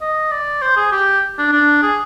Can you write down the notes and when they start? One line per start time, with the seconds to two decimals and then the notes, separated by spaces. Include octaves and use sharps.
0.01 D#5
0.31 D5
0.62 C5
0.76 G#4
0.92 G4
1.38 D4
1.52 D4
1.82 G#4